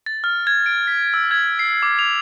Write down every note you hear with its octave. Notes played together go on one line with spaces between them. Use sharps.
A6
F6
G#6
D7
B6
E6
G#6
C7
D6
F7